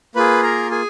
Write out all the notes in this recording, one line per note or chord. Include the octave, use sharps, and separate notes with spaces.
A#3 F4 G#4 B4 B5
A#4 A#5
G#4 G#5